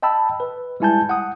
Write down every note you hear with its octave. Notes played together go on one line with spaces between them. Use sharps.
D#5 G5 A5 B5 E6
B4
G3 G#3 E4 G#5 A5 G6
F#5 D#6